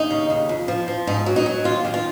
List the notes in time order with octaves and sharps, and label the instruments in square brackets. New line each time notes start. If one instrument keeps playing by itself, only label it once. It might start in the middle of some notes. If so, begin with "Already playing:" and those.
Already playing: [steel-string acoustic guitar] D#2 D#4
C#3
D#2
F2
F3
F3
G#2 D#4
F#3
D#4
F#3
D#2 F4
D#3
F4